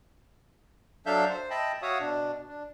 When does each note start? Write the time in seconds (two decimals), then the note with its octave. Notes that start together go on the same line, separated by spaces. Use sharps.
1.06 F#3 D4 A4 E5 F5 G6
1.30 C5
1.50 D#5 E5 G5 A5 B5
1.82 F#4 C#5 E5 F5 D#6
2.00 B2 D4
2.48 D4